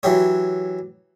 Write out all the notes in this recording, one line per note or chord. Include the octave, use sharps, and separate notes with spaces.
E3 F#3 G4 C#5